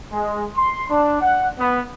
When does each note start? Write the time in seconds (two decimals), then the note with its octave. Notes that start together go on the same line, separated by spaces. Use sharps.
0.12 G#3
0.56 C6
0.89 D4
1.21 F#5
1.59 B3